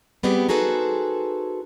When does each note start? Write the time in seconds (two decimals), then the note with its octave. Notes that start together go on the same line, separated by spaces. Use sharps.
0.23 G3 B3 C4 G4 G#4
0.49 D#4 F#4 G#4 A4 B4 C5